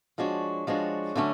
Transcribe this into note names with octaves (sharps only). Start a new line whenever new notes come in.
F3 G#3 D4 F#4 C#5
F3 G#3 D4 F#4 C#5
D3 F#3 A3 C#4